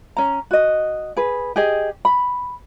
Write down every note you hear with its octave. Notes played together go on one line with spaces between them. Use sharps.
C#4 A#5
F#4 D#5
G#4 B4
G4 G#4 D#5
B5